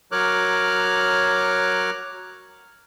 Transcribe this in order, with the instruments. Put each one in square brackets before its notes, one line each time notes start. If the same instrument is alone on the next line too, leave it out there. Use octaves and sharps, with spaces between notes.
[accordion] F#3 A#4 C#5 D6 F6 F#6